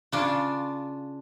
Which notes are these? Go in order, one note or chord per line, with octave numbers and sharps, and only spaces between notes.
C#3 D4 F4